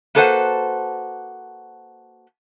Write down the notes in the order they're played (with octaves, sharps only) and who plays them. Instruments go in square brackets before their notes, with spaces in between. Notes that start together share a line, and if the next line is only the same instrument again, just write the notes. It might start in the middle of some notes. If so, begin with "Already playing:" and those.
[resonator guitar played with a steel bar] A#3 F#4 A4 B4 C5 F#5